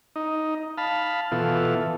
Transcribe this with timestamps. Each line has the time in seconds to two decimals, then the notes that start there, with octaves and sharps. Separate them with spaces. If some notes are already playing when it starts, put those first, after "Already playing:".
0.16 D#4
0.78 F5 A5 B5
1.32 B2 E3 F4 A4